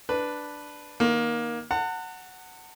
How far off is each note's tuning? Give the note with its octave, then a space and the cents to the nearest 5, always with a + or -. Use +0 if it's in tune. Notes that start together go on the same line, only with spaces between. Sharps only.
D4 +0 B4 +0
D#3 +0 A#3 +20
F#5 +0 A5 +45